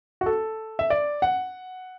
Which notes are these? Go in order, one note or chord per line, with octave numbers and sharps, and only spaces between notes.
F#4
A4
E5
D5
F#5